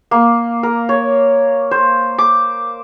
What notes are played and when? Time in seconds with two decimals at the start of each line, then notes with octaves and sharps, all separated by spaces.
0.11 A#3
0.63 A#4
0.89 C#5
1.71 C5
2.18 D6